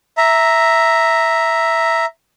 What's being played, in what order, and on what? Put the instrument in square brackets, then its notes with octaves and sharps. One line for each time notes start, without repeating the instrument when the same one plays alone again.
[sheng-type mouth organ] E5 A#5